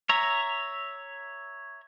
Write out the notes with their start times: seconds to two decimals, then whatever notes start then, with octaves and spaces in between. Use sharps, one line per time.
0.09 C#5 E5 A#5